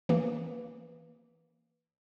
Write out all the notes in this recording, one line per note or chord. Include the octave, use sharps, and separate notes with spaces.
E3 A#3